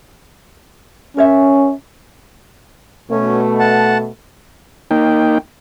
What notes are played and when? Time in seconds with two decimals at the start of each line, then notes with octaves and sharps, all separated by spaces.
1.17 C#4 A#4 C#5 E5
3.11 B2 A3 C#4
3.59 F#5 A5
4.91 A#3 D#4 G5